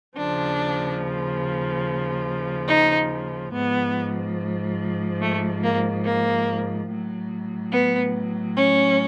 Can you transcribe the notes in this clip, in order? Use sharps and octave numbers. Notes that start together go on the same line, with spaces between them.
D#2 C#3 F3 D4
D#4
G#2 F3 B3
A3
A#3
A#3
A2 F#3
B3
C#4